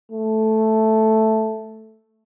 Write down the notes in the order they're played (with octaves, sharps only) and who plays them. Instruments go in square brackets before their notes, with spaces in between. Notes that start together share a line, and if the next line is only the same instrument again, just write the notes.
[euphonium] A3